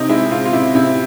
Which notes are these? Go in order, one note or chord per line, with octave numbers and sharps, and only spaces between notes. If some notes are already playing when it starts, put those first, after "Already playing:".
Already playing: C3 D#4
G#3 E4
C3 F4
F4
C3 E4
C3 E4